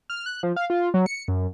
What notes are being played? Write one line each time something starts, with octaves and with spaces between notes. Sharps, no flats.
F6
F#6
F3
F5
F4
F#3
C#7
F#2